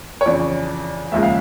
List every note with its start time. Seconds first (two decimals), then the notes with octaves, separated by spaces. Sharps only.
0.21 C#5
0.26 F2 C#3 E3 D5
1.12 D#2 C#3 F3 G#3 E5
1.23 F5